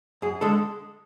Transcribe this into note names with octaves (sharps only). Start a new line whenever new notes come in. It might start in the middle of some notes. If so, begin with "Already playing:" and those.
F#2 G#4
D3 G#3 A4